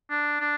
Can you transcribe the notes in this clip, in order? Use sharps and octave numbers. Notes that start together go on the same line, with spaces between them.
D4
D4